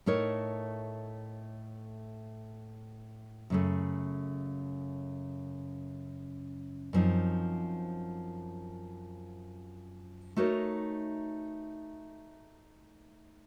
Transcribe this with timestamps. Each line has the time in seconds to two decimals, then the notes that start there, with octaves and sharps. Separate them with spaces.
0.06 A2 A3 D#4 A#4 C#5
3.50 F#2 C#3 A3
6.93 F#2 F3 C4 D#4
10.36 A3 D#4 F#4 A#4 C#5